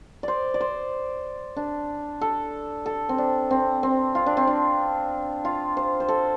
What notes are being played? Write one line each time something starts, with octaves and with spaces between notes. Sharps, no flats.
C5 D5
D5
C5
D4
A4
A4
C4
D4
C4
C4
F4
D4
C4
D4
F4
C5
C5
A4